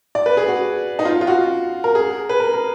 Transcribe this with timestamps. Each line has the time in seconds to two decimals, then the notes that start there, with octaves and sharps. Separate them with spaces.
0.15 D5
0.26 B4
0.37 G#4
0.48 F#4
0.99 D#4
1.05 F4
1.21 F4
1.27 F#4
1.84 A#4
1.95 G#4
2.29 B4
2.40 A#4
2.53 A#4